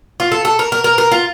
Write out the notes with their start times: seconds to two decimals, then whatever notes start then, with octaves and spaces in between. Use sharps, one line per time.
0.20 F4
0.32 A4
0.45 A4
0.59 A#4
0.72 A#4
0.84 A#4
0.98 A#4
1.11 F4